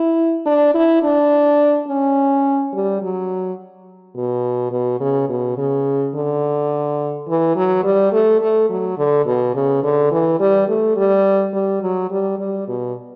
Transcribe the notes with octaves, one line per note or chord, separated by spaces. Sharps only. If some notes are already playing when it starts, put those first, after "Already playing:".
Already playing: E4
D4
E4
D4
C#4
G3
F#3
B2
B2
C#3
B2
C#3
D3
E3
F#3
G3
A3
A3
F#3
D3
B2
C#3
D3
E3
G3
A3
G3
G3
F#3
G3
G3
B2